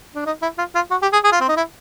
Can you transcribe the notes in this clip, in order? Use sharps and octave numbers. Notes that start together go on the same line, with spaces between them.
D4
D#4
E4
F4
F4
F#4
G4
G#4
G#4
F4
C4
D#4
E4